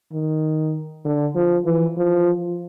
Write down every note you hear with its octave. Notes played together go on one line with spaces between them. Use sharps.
D#3
D3
F3
E3
F3